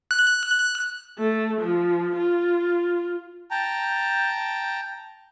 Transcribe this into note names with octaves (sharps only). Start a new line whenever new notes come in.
F#6
A3
F3
F4
G5 A5 A#5